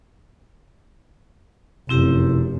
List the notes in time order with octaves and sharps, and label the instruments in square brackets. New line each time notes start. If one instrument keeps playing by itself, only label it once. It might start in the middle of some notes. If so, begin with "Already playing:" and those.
[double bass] F1 F#2 [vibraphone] C4 E4 G4